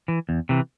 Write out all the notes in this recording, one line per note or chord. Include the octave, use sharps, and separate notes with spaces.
E3
E2
C3 E3